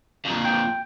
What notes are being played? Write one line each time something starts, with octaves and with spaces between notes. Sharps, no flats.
F2 A#2
G5